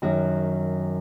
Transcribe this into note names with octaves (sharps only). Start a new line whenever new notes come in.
F#2 D#3 F#4